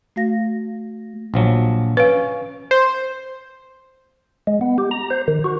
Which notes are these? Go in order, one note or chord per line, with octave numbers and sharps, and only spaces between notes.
A3 F#4 F5 A#6
A#1 F3 F#3
C#4 B4 F5
C5
G#3
B3
G4
A#5
C5
D#3
F#4